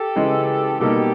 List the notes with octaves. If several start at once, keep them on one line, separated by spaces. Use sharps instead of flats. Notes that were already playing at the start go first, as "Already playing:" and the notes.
Already playing: G4 A4
C#3 E3 G#3
B2 G3 A#3 D#4 G4 A4